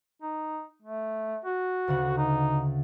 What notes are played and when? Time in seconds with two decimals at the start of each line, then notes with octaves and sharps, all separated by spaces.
0.22 D#4
0.82 A3
1.44 F#4
1.88 D2 C#3 F#5
2.17 D#4